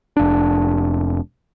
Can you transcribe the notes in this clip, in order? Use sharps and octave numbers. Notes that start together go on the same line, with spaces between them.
F1 D4